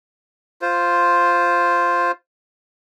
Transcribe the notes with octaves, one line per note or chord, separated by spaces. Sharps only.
F4 C5